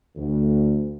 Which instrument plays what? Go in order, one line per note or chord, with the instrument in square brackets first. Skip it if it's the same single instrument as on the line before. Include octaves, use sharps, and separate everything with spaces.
[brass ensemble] D2